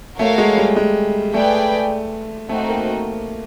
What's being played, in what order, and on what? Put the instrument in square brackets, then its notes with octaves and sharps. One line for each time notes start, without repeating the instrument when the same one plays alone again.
[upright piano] A3 [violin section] F#4 A#4 C#5 F5
[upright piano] G#3
G3
G#3
[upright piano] A3 [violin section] G#4 B4 D5 G5
[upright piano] A3 [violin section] C4 D#4 F#4
[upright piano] A#3